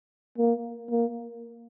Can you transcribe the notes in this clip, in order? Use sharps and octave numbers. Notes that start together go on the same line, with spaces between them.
A#3
A#3